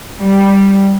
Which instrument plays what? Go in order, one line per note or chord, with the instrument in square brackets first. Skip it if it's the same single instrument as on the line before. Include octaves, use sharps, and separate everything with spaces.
[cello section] G3